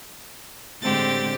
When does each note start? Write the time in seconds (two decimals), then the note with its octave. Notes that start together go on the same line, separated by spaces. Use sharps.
0.83 A2 D3 G#3 C4 G4 A6